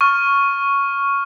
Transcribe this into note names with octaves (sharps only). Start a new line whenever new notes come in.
C#6 F6